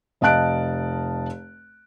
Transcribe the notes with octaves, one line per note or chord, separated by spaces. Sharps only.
F1 D#5 F5 A5 F#6 D7